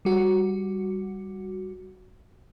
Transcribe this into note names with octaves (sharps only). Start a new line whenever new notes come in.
G3 F#4